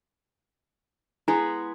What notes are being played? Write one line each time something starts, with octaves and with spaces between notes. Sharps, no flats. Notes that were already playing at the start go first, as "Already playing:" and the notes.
G#3 B3 E4 G#4